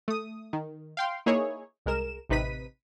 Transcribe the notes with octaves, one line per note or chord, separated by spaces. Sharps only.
A3 D#6
D#3
F5 G5 C6
A#3 D#4 E4 G#4 C#5
C2 G#3 A#4 E7
A1 C3 D#4 B4 B6 D#7